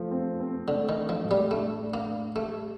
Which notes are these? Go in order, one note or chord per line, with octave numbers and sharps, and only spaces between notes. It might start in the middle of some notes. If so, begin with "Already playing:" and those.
Already playing: F3 A3
C4
C4
D3 A3
D#3
D4
F3
A2
G3
A3 D4
D4
A#3
D4
G3 A3